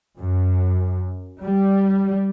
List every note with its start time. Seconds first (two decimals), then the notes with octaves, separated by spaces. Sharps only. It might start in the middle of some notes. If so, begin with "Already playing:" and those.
0.18 F#2
1.43 G3